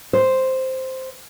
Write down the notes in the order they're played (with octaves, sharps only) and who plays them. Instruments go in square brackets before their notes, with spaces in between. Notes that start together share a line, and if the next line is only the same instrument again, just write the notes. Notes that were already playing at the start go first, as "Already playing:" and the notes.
[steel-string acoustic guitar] C5